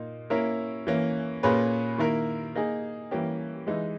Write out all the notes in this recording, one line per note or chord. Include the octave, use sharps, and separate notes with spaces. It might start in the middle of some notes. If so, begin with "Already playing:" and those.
Already playing: A#2 A#3 D#4
A#3 C#4 E4 A#4
E3 A#3 C#4
A#2 A#3 C#4 G#4 B4
D#3 A#3 E4 A#4
A#3 D#4 G#4
E3 G3 A#3 C#4 G4
E3 G#3 D#4